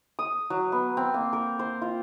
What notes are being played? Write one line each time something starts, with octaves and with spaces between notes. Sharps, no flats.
D#6
F#3
B3
C4
A#3
A#4
C5
F4